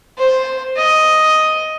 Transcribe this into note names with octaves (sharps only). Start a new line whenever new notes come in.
C5
D#5